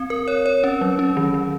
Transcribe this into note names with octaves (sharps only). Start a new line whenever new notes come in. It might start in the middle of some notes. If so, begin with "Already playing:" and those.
Already playing: C4
A#4
C#5
C#5
C#4
F#3
C#4
D#3
D#3